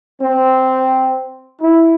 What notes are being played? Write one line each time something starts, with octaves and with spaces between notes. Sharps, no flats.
C4
E4